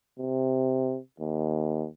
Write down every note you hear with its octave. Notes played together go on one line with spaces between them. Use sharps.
C3
D#2